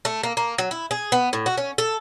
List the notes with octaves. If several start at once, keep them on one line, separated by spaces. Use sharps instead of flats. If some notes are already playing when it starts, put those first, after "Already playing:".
A3
A#3
A#3
F#3
E4
G#4
B3
A2
F#4
C#4
A4